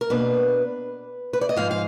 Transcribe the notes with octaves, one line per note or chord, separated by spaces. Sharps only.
A#4
B2 A#3 D4 B4
B4
D5
D#5
G#2 F3 G#3 F5
F5